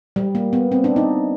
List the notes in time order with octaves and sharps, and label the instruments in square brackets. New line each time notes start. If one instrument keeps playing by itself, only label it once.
[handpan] G3
A#3
B3
C4
D4
D#4